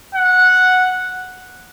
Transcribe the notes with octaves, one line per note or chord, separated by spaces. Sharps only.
F#5